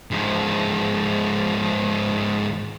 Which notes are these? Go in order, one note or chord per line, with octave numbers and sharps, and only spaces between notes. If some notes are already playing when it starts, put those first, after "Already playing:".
G#2 F3